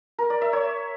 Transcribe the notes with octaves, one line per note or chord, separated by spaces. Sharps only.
A#4
D5
E5
C#5